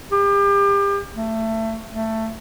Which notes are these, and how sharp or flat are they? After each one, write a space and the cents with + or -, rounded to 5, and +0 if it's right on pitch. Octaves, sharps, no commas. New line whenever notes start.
G4 +35
A3 +20
A3 +15